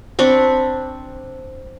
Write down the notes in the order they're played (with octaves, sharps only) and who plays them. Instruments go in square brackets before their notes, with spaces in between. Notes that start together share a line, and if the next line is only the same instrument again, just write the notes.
[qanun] C4 D4 B5 C#6